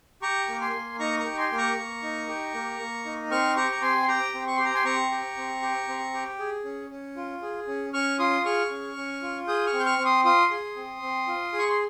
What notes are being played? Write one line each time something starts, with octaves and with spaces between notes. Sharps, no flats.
G4 A#5 C#6
A#3
G#5 C6
A#3
D#4 A#5 C#6
A#5 C#6
G4
G#5 C6
A#3
A#5 C#6
A#3
D#4
G4
A#3
A#3
D#4
C4 C#6 F6
G4 A#5 C#6
A#5
C4 G#5 C6
C6
G4 G5 A#5
C4
C#6
G4 C6
A#5
G#5 C6
C4 A#5 C#6
G4
C4
G4
C4
G4
G#4
C#4
C#4
F4
G#4
C#4
C#4 C#6 F6
F4 C6 D#6
G#4 C#6 F6
C#4
C#4
F4
G#4 D#6 G6
C#6 F6
C4
G6
C#6 F6
C4
C6 D#6
F4 C6 D#6
G#4
C4
C4
F4
G#4
C#6
C6